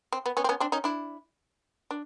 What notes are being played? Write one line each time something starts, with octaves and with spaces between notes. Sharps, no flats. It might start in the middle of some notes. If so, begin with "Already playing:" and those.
C4
B3
B3 C#4
C4
B3 C#4
C4 D4
C#4 D#4
D4 E4
D4